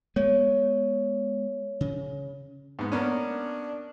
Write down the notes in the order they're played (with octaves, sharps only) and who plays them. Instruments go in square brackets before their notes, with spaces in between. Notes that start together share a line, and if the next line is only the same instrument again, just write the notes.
[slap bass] G#3 B3 [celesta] C#5
[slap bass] C#3
[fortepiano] G#2 B3
[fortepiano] A#3 B3 C#4 [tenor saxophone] D4